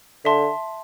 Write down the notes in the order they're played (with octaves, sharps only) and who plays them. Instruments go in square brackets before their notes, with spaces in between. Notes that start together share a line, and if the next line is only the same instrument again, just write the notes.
[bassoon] D3 [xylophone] E5 A5 C6